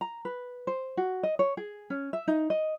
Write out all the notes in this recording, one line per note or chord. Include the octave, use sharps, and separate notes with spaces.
A#5
B4
C5
F#4
D#5
C#5
G#4
C#4
E5
D#4
D#5